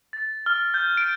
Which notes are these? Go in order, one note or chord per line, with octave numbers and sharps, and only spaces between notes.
A6
F6
G6
D7